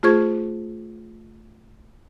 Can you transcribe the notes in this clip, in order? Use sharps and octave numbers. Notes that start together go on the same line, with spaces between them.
A3 F4 G#4 C5 C#6 G#6